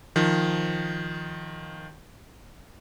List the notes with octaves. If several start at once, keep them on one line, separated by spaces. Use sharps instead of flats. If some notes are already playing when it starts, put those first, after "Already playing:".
D#3 F3